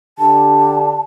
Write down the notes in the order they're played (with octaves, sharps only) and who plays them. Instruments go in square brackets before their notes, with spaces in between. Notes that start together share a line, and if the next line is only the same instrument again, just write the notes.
[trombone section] D3 D4 G4 [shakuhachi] A5